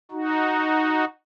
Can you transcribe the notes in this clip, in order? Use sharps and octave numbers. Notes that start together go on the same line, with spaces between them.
D#4 F#4